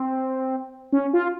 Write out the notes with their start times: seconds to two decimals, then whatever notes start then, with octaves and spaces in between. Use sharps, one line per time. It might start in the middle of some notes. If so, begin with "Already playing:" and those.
Already playing: C4
0.92 C#4
1.13 F4